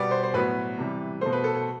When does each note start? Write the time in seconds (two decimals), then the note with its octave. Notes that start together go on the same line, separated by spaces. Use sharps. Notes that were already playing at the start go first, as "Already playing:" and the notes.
Already playing: B2 G3 B3 D5
0.11 C5
0.23 C5
0.34 A2 F#3 B3 B4
0.78 C3 E3 G3
1.21 B2 A3 C5
1.32 B4
1.44 A4
1.55 A4